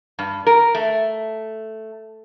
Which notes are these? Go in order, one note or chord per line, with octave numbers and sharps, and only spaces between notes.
G2
A#4
A3